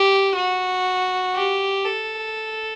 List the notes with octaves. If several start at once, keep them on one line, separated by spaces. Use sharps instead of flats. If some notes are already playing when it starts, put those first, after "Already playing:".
Already playing: G4
F#4
G4
A4